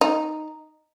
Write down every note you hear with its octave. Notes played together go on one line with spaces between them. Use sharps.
D#4